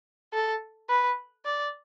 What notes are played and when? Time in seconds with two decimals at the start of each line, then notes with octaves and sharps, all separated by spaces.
0.33 A4
0.90 B4
1.45 D5